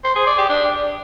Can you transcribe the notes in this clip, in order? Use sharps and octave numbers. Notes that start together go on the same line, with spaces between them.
C5
G#4
D5
G4
D4